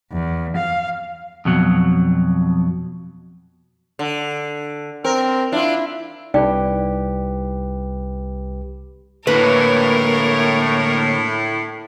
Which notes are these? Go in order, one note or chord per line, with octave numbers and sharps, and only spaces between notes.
E2
F5
F2 B2 F#3
D3
C4 A#4
D4 E4 F4
C2 D#4 G4 B4 D5 G5
A2 D3 A#3 A#4 B4 C#5